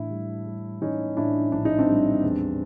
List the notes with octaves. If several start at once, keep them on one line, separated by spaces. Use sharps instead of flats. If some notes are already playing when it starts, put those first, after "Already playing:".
Already playing: A2 E3 D4 E4
G3
G3
E3 C#4 D#4
A2 D4 E4
A#1 D4
D#4
C4 D4
G3
E2